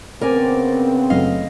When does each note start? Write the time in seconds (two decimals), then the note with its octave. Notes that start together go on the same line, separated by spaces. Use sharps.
0.21 C#3 B3 C4 A#4 D5 G#5
1.10 F#1 F#3 A3 D#5 F5